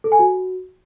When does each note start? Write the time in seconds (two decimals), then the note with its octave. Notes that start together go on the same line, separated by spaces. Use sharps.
0.04 A4
0.12 G#5
0.19 F#4